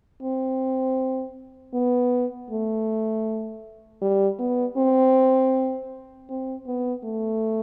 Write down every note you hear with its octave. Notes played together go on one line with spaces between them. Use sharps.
C4
B3
A3
G3
B3
C4
C4
B3
A3